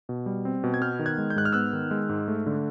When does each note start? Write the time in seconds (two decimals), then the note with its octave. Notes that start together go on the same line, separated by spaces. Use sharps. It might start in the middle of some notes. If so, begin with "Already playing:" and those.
0.09 B2
0.26 G3
0.45 C4
0.64 B2
0.74 G#6
0.81 B3 F6 G6
0.99 D#3
1.06 F#6 G#6
1.18 G#3
1.30 G6
1.36 G#2 F#6
1.45 F6
1.53 B3 E6 F#6
1.73 D#3
1.91 G#3
2.09 G#2
2.28 A3
2.46 D3